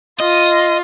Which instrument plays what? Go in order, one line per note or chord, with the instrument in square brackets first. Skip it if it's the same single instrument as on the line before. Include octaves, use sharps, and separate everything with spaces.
[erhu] F4 [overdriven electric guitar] D#5